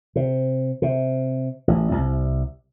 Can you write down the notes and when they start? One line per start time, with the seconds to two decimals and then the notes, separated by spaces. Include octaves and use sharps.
0.16 C3
0.82 C3
1.68 A1
1.91 C2